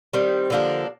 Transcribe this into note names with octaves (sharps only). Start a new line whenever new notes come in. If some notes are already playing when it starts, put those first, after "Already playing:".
D#3 G3 C4
D3 F3 A#3 D4